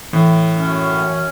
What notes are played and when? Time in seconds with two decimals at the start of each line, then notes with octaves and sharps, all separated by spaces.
0.13 A2 E3
0.57 F#2 C#4